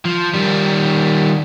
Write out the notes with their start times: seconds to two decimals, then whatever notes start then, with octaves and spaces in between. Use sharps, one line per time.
0.05 F3
0.33 D#3 G3